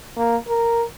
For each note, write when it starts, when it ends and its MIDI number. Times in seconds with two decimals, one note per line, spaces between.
0.17 0.36 58
0.48 0.83 70